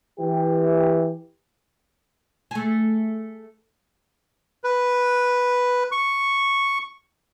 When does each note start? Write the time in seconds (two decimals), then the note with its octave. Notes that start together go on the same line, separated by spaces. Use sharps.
0.20 E3 G4
2.51 A3 G#4
4.64 B4
5.92 C#6